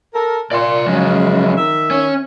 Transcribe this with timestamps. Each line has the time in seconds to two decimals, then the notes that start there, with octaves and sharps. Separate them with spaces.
0.14 A4 A#4
0.51 A#2 D5 C6
0.86 F2 C#3 F#3 G#3
1.57 D#3 E5
1.91 C#4